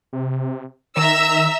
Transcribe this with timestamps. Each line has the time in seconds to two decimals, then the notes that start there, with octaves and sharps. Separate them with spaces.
0.13 C3
0.97 D#3 E5 A#5 E6